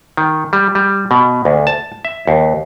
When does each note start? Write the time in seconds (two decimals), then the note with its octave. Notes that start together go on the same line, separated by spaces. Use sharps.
0.17 D#3
0.53 G3
0.75 G3
1.11 B2
1.45 D2
1.67 A5
2.05 E5
2.27 D#2